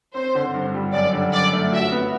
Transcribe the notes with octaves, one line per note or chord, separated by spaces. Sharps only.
C4 C5
D3
G2
G3
F#2 D5
D3
F#2 D5
A3
F#4 E5
B3